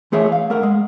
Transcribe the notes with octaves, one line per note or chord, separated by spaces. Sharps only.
E3 A3 G#4 C#5 E5
F5
A3 A#4 F#5
G#3